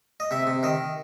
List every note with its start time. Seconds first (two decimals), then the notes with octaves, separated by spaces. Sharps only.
0.20 D#5
0.31 C3 E5
0.47 C3
0.63 D#3 D#5